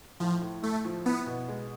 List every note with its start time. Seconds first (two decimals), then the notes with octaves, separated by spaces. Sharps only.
0.20 A2 F3
0.42 A2
0.62 A3 E4
0.85 F3
1.06 B3 E4
1.27 B2
1.48 G#3